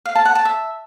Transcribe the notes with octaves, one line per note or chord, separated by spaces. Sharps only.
F5
A5
F#5
A5
E5